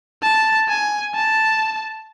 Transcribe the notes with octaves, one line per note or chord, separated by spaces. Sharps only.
A5
G#5
A5